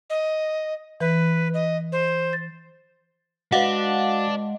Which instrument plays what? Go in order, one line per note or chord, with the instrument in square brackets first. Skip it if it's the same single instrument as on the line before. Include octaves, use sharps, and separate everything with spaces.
[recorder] D#5
[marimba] E3 [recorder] B4
[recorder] D#5
C5
[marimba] A6
[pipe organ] G#3 [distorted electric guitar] D4 [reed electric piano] F#4 B4 [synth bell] F5 F#5